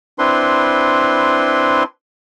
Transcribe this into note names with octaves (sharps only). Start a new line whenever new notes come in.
C4 D4 E4 B4 C6